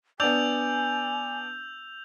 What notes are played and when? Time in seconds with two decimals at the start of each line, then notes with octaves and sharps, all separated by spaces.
0.20 B3 D4 G#5 E6 G6 F7